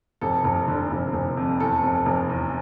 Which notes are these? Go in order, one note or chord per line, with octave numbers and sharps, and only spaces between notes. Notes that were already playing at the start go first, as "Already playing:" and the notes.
F1 A4
F1
D3
F1
F1
F2
E2 A4
F1
F1
E2